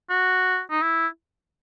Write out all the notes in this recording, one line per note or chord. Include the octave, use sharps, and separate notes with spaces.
F#4
D#4
E4